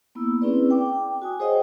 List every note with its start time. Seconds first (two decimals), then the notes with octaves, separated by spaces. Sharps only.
0.15 A#3 B3 E4 E6
0.42 C4 C#4 E4 G#4 B4 D5
0.70 G5 D6
1.22 F#4 G#5 D#6
1.40 G#4 C5 C#5 D#5 F#5 G5